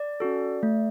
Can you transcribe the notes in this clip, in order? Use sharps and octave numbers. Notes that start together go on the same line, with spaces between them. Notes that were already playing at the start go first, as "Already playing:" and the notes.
Already playing: D5
C#4 F#4 A4
A3